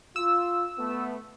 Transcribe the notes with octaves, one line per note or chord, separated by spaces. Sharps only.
F4 E6
A3 B3